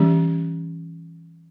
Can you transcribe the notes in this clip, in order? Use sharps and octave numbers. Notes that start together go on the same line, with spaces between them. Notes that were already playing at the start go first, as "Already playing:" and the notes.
Already playing: E3 G3 C#4 G4